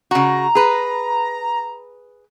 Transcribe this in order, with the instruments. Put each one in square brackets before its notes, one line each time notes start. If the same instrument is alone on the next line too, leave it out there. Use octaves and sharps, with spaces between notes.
[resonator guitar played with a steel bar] C#3 F#4 [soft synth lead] A#5
[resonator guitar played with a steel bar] G#4 B4